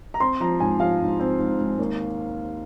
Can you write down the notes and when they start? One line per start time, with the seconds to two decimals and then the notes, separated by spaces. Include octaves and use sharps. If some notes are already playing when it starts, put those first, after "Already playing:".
0.14 A#5
0.20 C4 C6
0.40 F3 A#5
0.60 G#2 G#5
0.80 F3 F5
1.00 G#2
1.19 C4
1.39 G#2
1.59 G#2
1.79 D#2